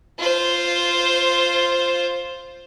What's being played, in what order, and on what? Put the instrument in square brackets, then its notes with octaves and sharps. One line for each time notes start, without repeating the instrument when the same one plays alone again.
[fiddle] F4 C5